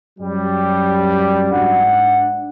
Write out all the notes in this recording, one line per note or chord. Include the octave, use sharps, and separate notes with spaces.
F#2 F#3 G3
G#2 D4 F#5